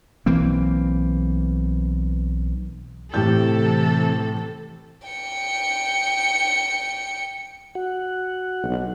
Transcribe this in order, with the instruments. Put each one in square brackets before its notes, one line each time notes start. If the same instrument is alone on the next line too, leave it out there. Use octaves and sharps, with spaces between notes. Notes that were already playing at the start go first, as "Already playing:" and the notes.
[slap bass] B1 E3 A#3 C4
[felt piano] A2 G4 G6 [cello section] C3 E3 A4
[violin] G5 C#7
[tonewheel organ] F#4 F#5
[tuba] B1